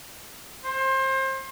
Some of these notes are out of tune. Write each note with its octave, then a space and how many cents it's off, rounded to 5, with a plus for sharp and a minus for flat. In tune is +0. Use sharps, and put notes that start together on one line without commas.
C5 +25